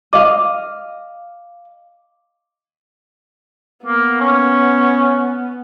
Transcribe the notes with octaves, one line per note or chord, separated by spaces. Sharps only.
D#5 F5 D6
A#3 B3
C#4